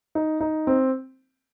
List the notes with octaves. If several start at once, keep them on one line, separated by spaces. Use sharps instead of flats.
D#4
D#4
C4